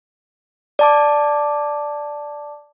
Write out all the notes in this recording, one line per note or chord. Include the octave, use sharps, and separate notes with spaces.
D5 A5 D6